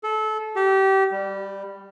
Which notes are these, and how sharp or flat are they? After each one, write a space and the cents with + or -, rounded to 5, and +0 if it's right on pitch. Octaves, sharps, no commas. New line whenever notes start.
A4 -25
G4 -25
G3 +10